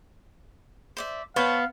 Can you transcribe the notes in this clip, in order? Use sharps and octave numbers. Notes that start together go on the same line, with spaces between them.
C5 D5 E5
B3 C5 C#5 F5 A5